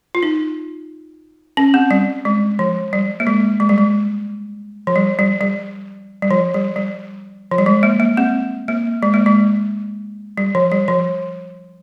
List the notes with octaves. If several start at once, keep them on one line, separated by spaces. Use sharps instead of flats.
F4
D#4
C#4
C4
G3
G#3
F3
G3
A#3
G#3
G#3
G3
G#3
F3
G3
G3
G3
G3
F3
G3
G3
F3
G3
G#3
A#3
A#3
C4
A#3
G#3
A#3
G#3
G3
F3
G3
F3